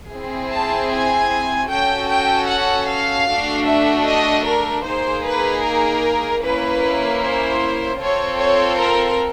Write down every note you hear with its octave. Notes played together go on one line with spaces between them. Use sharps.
C4 E4 G#4
A5
G#5
C#4 F#4 A4 G5
G5
F#5
F5
A3 D4 F#4 A4
E5
D#5
A#4
A#3 D#4 G#4 C5
B4
A#4
A#3 C#4 E4 B4
C5
C4 F4 A4 C#5
C#5
A#4